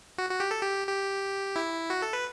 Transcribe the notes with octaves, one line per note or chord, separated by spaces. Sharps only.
F#4
F#4
G4
A4
G4
G4
E4
F#4
A4
B4